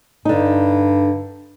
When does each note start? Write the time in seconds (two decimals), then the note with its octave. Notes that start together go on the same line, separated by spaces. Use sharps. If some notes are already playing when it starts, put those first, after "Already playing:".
0.25 G2 D3 D#4